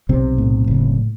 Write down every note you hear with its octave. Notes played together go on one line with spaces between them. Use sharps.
B1 C3 C4
A2
F#1